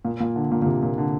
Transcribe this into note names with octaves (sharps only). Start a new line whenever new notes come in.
A#2
A#2
D3
A#2
A#2
C3
A#2
D3